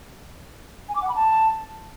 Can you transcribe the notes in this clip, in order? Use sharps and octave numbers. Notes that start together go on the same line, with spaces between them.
G#5
D6
F#5
B5
A5